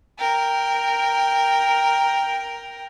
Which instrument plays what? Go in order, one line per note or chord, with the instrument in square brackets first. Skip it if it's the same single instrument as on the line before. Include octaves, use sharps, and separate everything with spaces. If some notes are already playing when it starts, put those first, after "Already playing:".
[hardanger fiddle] A#4 G5